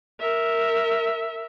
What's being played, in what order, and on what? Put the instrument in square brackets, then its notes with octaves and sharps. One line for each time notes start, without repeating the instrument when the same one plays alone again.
[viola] A#4 E5